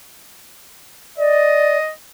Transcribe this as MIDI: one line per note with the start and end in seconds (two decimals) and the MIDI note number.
1.18 1.78 74
1.18 1.93 75